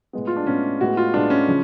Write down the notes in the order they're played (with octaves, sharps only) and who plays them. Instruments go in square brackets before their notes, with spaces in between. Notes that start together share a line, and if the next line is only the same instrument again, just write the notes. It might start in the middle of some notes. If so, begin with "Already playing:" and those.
[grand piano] A2 G#3 B3
F4
D4
A2 G#3 B3 C#4
A2 G#3 B3 F#4
F4
A2 G#3 B3 D4
C#4
C#3 F3